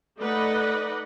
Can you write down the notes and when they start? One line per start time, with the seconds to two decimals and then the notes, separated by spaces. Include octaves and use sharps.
0.17 A3 D#4 B4 D5 D#5 F#5